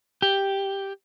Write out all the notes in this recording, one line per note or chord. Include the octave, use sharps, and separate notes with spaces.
G4